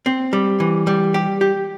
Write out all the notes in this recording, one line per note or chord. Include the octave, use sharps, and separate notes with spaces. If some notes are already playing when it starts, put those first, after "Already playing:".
C4
G3
E3
G3
G4
G4